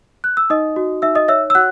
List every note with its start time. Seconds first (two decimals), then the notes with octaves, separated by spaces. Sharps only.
0.24 F#6
0.37 E6
0.50 D#4 D#5 D#6
0.76 F#4
1.02 D#4 E5 E6
1.15 D#5 D#6
1.28 C#5 E5 E6
1.50 E6
1.55 F#4 F#5 F#6